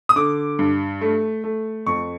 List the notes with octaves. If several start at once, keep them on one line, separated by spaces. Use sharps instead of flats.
D#6
D3 D6
G2
A3
A3
F2 C#6